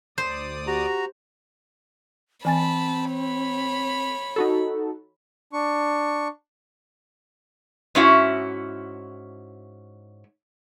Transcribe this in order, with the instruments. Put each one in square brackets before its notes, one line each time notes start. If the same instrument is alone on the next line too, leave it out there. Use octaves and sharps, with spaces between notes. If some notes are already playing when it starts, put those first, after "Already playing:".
[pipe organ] D2 D5 D#6 [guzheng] C5
[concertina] F#4 A#5 [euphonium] G4
[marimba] E3 G#5 A6 [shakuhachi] C4 [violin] A5 B5
[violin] C#5 B5
[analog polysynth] D#4 F#4 A4
[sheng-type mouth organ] D4 C#6
[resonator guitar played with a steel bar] G#2 C#4 E4 F#4